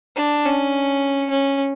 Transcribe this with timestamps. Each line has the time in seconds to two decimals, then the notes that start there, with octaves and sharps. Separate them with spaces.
0.16 D4
0.45 C#4
1.30 C#4